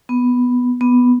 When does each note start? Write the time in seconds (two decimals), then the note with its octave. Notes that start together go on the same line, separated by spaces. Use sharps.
0.09 B3
0.81 B3